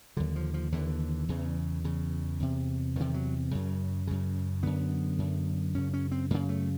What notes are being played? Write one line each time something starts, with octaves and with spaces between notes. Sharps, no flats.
D#2 D3 F#3
F3
F3
D#2 D3 E3
E2 C#3
E2 C#3
E2 C3
E2 C3 D#3
F#3
F#2 C#3
F#2 C#3
F#2 D3 B3
F#2 D3
F#2 C#3 C#4
C#4
C4
F#2 C#3 A#3
A3